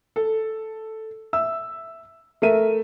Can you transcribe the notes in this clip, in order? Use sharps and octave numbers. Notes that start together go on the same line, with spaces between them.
A4
E5 E6
A3 A#4 E5 D#7